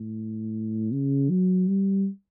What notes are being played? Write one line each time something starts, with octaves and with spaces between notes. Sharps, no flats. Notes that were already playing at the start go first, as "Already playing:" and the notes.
Already playing: A2
C#3
F#3
G3